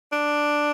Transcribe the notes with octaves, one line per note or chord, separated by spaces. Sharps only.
D4